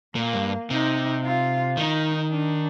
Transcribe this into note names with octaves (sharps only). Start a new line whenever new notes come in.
A#2 A#3
G2
C3 D#4
F4
D#3 D#4
D4